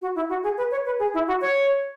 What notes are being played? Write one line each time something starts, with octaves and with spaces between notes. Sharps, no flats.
F#4
E4
F#4
G#4
B4
C#5
B4
G#4
E4
F#4
C#5